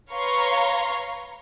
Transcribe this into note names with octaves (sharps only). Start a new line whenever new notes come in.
B4 C#5 F5 A#5 C6 C#6